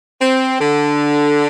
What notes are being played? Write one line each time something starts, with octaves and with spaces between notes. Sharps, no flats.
C4
D3